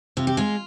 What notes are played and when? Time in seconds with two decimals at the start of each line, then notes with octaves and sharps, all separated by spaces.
0.17 C3 F4
0.27 G4
0.37 G#3 F4